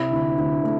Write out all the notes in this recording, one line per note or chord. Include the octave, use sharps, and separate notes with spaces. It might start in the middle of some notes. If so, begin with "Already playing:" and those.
Already playing: C3 E4
D2
D2
A3